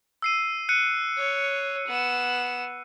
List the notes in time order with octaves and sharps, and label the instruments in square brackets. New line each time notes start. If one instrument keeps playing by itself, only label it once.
[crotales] E6 C7 D#7
F#6 C#7 D#7
[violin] C#5
B3 E7